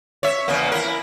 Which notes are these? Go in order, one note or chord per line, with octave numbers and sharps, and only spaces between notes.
C#5 E5
E2 C#3 A#3
E4 A#4